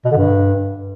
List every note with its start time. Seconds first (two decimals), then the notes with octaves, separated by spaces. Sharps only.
0.05 B2
0.11 D3
0.17 G2